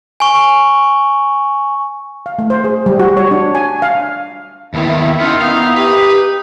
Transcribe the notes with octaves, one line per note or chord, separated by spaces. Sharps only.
G#5 C#6
F5
A3
C5
G#4
G3
F#4
C#5
D4
G#5
F5
D#2 D#3 B3 E4 E5
B3 C#4 D#4 F4
B3 D#4 F5
G4 B4